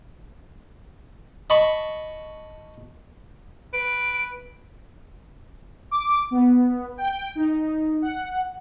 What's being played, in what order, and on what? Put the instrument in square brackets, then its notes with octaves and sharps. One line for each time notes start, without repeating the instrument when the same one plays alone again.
[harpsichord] D#5 A5 B5 C#6
[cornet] B4 [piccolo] D7
[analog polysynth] D6
B3
G5
D#4
F#5